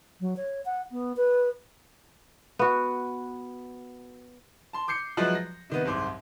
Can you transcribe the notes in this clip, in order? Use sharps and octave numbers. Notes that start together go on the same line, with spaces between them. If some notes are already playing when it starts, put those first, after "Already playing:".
F#3
C#5
F#5
B3
B4
B3 F#4
A5 C6
D6 G6 C7 C#7
F3 F#3 G#3 E4 F#4 B4
A#6
C3 D#3 B3
F#1 C2 G#2 C5 D6